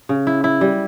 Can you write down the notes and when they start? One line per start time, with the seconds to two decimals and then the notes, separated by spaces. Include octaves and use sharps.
0.09 C#3
0.27 E4
0.44 E4
0.61 G3